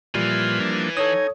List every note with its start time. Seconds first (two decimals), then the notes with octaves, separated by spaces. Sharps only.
0.15 A#2 E3 F3 G3 F4
0.60 F3 A#3 D4
0.97 D#4 A4 C#5 G#5 D#6